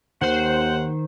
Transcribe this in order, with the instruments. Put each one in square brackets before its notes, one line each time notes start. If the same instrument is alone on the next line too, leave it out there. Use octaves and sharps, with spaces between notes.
[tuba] D#2 [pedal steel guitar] D#3 F#6 [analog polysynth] C5 [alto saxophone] F#5